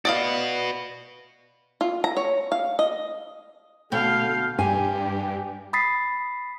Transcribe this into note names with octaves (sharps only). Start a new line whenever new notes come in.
F#4 B4 D5 D#5 F5
F4
A#5
C#5
F5
D#5
D2 B2 A3 F5 G5
G2 G4 G#5
B5 D#6 A6 B6 C7